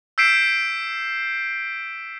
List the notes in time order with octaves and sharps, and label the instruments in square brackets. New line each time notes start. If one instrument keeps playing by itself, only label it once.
[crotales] E6 G6 B6 C7 D7 E7